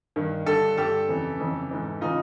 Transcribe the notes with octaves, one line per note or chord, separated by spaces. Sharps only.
G2 D#3
G2 D3 G4 A4
G2 D3 G4 A4
F2 C#3 E3
F2 C#3 E3
G#2 E3
C#3 E3 D#4 F4